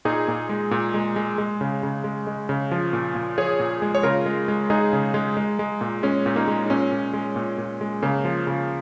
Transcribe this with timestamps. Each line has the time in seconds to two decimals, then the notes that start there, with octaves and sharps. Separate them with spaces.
0.05 A#2 D#4 G#4
0.28 A#2
0.49 G#3
0.71 A#2
0.94 G#3
1.16 G#3
1.38 G#3
1.61 C#3
1.83 C#3
2.04 G#3
2.27 G#3
2.49 C#3
2.71 F3
2.93 A#2
3.15 A#2
3.38 F3 G#4 C#5
3.60 A#2
3.82 G#3
3.95 C#5
4.03 C#3 F4 A#4
4.26 G#3
4.48 G#3
4.70 G#3 D#4 G#4
4.93 C#3
5.14 G#3
5.37 G#3
5.59 G#3
5.81 A#2
6.03 G#3 C#4
6.26 A#2
6.36 A#3 D#4
6.48 G#3
6.65 D#4
6.70 A#2 C#4
6.92 A#2
7.13 G#3
7.36 A#2
7.58 A#2
7.81 G#3
8.02 C#3 A#3
8.25 F3
8.47 C#3